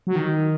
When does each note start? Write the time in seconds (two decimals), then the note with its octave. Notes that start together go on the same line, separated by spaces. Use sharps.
0.07 F#3
0.16 D#3